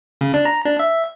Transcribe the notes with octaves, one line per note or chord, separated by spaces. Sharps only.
C#3
D4
A#5
D4
E5